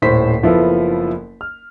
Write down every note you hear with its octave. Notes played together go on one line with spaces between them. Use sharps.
D#1 A2 C5 B6
F#1 F3 B3 E4 A4
F6